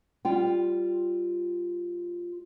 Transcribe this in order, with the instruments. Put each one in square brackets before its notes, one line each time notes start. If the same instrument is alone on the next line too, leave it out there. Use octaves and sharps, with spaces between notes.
[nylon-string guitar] G3 F4 G5